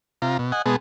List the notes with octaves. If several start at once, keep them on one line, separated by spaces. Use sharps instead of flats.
C3 F4 A#5
B2
D#5 F#5 G#5
B2 G#3 B3 G#4 A5